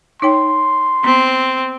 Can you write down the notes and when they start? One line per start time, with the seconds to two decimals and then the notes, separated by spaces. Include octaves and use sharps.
0.22 D#4 C#5 G5 C6
1.04 B3 C4